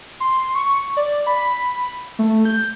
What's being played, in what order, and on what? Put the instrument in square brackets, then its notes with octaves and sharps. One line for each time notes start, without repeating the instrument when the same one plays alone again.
[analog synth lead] C6
C#6
D5
B5
A3
G6